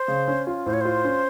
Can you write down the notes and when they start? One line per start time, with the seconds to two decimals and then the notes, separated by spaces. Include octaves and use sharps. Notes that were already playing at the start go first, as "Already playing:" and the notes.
Already playing: C5
0.08 C#3
0.28 C#4
0.47 F4
0.66 A2 C5
0.73 C#5
0.81 F4 C5
1.05 C#4